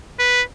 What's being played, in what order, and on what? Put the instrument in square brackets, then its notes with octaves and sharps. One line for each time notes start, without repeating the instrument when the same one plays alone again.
[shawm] B4